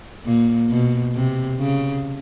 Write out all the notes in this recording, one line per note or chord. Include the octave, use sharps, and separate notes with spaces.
A#2
B2
C3
C#3